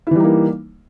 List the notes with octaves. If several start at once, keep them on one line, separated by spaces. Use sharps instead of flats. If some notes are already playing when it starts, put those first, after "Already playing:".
E3 G3 A#3 D#4 E4